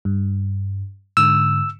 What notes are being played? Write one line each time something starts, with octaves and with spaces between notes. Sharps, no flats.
G2
G#2 D3 E6